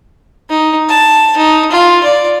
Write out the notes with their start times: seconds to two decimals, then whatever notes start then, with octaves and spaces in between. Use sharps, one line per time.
0.50 D#4
0.89 A5
1.38 D#4
1.72 F4
2.04 D5